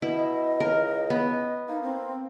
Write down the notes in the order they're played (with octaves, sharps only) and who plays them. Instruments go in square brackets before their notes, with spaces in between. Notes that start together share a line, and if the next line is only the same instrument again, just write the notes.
[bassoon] B2 [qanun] E4 [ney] D#5
[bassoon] C#2 [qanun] A#4
[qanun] B3
[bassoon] A#3 [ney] D#4
[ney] C4